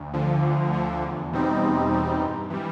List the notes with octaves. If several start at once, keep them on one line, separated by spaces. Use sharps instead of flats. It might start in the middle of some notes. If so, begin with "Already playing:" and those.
Already playing: D2
D3 F3
D2
D3 F3
E2
B2 G3 C4 D#4
E2
B2 G3 C4 D#4
G2
E3 G3